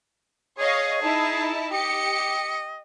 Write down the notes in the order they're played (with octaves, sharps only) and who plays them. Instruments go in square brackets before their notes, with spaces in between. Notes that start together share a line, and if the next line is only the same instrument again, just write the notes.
[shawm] G#4 [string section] C#5 D#5 F5
[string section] D#4 E4 A5
[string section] G4 C#7 [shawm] D#5